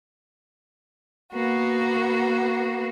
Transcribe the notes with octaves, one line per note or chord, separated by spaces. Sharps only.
A#3 B3 F#4